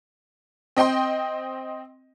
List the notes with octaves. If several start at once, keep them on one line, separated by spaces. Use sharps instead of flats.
C4 D#5 G5 C6